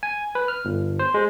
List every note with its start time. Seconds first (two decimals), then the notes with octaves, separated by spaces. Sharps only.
0.03 G#5
0.35 B4
0.48 F6
0.65 G1
0.99 C5
1.14 G#3